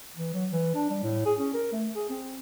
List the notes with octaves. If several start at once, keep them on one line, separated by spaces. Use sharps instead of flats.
E3
F#3
E3
D4
G3
A2
G#4
C#4
A#4
A3
G#4
C4